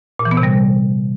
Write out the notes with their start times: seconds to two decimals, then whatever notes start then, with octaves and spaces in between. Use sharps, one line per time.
0.19 A#2
0.25 E3
0.31 B3
0.37 C3
0.43 G3